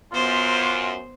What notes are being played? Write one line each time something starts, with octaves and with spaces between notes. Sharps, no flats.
F#2 B3 F4 C5